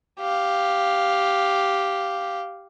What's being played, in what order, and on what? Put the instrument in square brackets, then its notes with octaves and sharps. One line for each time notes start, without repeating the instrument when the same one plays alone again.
[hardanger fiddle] G4 F5